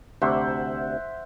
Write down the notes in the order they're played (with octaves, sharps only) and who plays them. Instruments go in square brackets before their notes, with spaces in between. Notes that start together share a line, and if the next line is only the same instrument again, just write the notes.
[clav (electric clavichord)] D2 C3 [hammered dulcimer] C5 E5 F#5